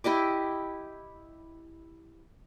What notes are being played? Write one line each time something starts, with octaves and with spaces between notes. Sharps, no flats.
E4 G4 D#5 D6